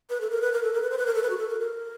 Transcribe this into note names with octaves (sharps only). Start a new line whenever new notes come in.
B4
A4
A#4
B4
A#4
A4
A#4
B4
C5
B4
A#4
A4
B4
F#4
A4
A#4
A#4